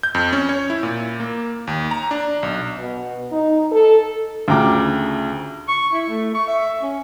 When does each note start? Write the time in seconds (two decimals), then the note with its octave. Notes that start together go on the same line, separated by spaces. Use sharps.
0.03 G6
0.15 F2
0.33 C#4
0.49 C#5
0.70 E4
0.83 A#2
1.20 A#3
1.67 D#2
1.91 A#5
2.11 D4
2.43 B1
2.79 B2
3.32 D#4
3.72 A4
4.48 D2 C#3 F4 G5 A#5 D6
5.68 C#6
5.93 E4
6.09 A3
6.35 C#6
6.48 E5
6.82 C#4